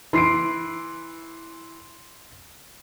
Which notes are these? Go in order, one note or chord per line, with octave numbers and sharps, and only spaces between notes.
E3 C6 C7 D7